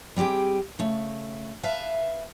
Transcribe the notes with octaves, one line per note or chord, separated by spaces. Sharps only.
G3 C4 G4 G#4 G5
C#3 A3
B4 E5 F5 A5